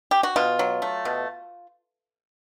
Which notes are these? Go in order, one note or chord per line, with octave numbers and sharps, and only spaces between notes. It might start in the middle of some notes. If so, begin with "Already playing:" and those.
G4
F#4
B2 F4
F#3
A3
B2